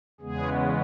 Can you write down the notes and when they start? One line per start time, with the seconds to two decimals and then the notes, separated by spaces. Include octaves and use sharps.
0.21 E2 C#3 G#3 B3 G#4